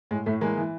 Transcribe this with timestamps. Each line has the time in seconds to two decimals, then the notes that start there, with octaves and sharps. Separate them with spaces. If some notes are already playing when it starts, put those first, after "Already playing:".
0.11 A2 G#3
0.26 A2 A3
0.41 E3 G#3 A#3
0.57 E3